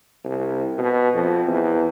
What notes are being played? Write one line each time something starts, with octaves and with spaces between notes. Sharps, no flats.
C2
B2
F2
E2